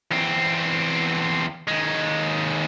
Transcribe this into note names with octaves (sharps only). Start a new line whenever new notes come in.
E2 C4
D#2 G#3